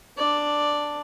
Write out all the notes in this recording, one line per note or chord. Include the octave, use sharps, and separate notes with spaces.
D4 D5